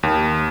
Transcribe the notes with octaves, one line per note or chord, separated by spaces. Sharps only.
D#2